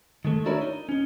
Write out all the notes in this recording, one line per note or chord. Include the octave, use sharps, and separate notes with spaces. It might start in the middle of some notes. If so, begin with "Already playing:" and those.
D#3 G#3 A3
D4 E4 F#4 A#4 C#5 D5
D#4
C#4 D#4